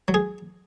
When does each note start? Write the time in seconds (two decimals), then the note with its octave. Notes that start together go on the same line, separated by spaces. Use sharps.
0.08 F#3
0.14 G#4